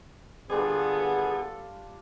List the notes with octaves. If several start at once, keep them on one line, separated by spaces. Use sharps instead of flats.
D3 G3 B3 D4 F4 G#4 A4